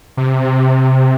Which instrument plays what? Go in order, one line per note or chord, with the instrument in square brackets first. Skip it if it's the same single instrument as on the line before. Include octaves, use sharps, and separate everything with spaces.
[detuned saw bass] C3